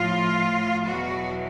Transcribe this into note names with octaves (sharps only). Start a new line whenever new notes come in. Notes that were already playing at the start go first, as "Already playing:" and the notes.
Already playing: A2 F3 F4
E2 B2 F#3 F#4